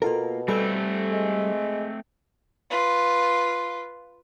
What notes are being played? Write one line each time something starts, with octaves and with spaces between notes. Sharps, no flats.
B2 A#3 F4 A4 A#4
G3 A3 C4 A4 G#5
G#3
F4 B4